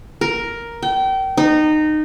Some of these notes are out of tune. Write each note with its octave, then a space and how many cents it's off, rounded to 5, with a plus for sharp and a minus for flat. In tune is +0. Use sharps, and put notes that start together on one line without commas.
A#4 +5
G5 -30
D#4 -20